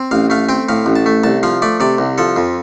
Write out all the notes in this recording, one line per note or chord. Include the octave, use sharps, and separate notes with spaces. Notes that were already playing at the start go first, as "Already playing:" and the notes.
Already playing: C4
A1 F5
A3 F5
C4 G5
A2 F5
A1
A5
A3
C2 A5
F3 F5
A3 D5
C3 D5
C2
F3 A4
F2